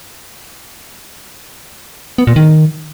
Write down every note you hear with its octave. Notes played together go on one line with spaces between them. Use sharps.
B3
A#2
D#3